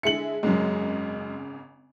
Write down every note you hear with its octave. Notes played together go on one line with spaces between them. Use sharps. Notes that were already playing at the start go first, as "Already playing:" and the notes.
D3 G#3 E4 C#7 F#7
G#1 F#2 C#3 G#3